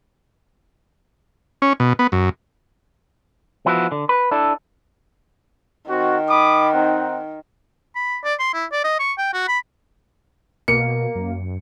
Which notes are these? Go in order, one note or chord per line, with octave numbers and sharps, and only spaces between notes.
C#4
B2
B3
F#2
F3 B3 E4 F#4
D3
B4
D4 E4 A4
D#3 C4 F#4
B5 D6 D#6
C4 D#4 F#5
B5
D5
C6
E4
D5
D#5
C#6
G5
F#4
B5
B2 A#3 C#7
F#2